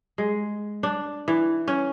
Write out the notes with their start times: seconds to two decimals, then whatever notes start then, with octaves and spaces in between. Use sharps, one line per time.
0.18 G#3
0.83 D4
1.28 E3
1.68 C#4